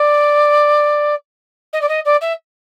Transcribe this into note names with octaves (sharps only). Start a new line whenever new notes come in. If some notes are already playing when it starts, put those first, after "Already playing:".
Already playing: D5
D#5
D5
D#5
D5
E5